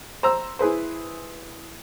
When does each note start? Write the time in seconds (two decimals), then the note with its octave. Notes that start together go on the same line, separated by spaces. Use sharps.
0.23 C5 A#5 E6
0.59 E4 G#4 B4 C5